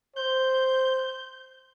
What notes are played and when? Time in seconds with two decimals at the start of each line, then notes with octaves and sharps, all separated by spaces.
0.16 C5 G6